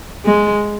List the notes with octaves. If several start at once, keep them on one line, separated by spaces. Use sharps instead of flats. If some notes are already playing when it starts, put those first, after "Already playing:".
G#3